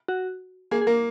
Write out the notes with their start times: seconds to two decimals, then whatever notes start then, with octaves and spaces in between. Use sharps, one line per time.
0.08 F#4
0.71 A#3 G#4
0.81 G#4
0.87 A#3 A#4